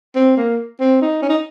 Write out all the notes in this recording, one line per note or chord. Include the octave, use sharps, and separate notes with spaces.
C4
A#3
C4
D#4
C#4
D#4